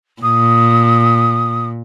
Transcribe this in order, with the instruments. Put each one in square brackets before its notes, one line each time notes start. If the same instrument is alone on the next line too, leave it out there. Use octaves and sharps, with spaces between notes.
[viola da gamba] A#2 [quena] D#6